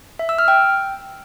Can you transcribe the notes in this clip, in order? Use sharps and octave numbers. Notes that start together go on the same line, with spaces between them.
E5
E6
F6
G5